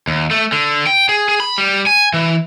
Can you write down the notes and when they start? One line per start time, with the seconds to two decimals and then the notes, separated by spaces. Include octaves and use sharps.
0.07 D#2
0.31 A3
0.52 D3
0.87 G5
1.09 G#4
1.29 G#4
1.40 B5
1.58 G3
1.87 G#5
2.14 E3